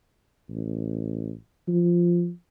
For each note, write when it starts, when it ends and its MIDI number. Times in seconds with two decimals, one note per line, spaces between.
0.49 1.32 33
1.68 2.31 53